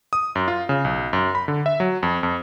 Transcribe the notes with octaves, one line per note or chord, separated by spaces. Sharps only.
D#6
F#2
F4
C#3
B1
F#2
B5
D3
E5
F#3
F2
F2